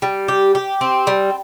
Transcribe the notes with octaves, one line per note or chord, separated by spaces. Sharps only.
G3
G4
G4
C4
G3